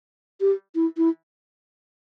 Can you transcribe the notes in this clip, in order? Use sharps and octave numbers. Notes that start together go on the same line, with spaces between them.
G4
E4
E4